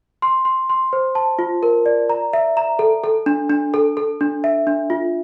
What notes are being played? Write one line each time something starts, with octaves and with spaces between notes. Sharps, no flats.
C6
C6
C6
C5
A5
F4
A#4
D5
A#5
E5
A#5
A4
A4
D4
D4
A4
A4
D4
E5
D4
F4